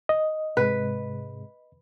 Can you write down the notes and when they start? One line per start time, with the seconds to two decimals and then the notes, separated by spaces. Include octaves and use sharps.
0.09 D#5
0.57 G#2 C3 G#3 B4